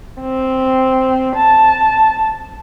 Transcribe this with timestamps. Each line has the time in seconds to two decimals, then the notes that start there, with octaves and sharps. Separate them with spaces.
0.21 C4
1.36 A5